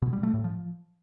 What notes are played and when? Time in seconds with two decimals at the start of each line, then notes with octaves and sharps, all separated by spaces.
0.02 B2
0.13 G3
0.23 A3
0.34 A2
0.44 F3